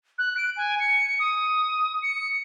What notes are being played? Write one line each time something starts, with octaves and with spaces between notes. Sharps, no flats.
F#6
D7
G#5
C#7
D#6
C#7